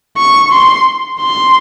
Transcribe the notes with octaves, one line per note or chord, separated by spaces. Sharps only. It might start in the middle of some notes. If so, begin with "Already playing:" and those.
C#6
C6
C6